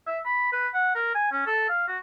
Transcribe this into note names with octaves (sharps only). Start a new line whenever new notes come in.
E5
B5
B4
F#5
A#4
G#5
C#4
A4
F5
F#4